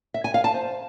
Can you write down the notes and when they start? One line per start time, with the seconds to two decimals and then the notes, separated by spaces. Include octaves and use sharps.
0.14 E5
0.24 G#5
0.34 F5
0.44 A5
0.54 C5